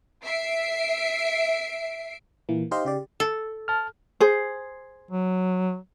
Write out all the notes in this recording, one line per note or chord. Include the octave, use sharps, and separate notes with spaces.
E5 C7 D7
A#2 E3 A#3
D#4 G4 C5 D#5 F5 C6
C#3 G4 D5
A4
A5 F6
G#4 C5
F#3